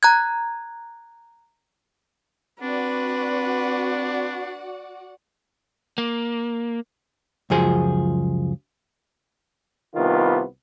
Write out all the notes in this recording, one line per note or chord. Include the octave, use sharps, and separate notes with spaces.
A#5 F#6 G#6
C4 D4 F#4 B4 D5 F#5
A#3
C#2 F#2 F3 G#4 C5
C2 D#3 B3 F4